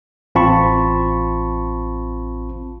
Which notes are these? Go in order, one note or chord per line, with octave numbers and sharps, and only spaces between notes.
A1 C4 F4 A5 B5 C#6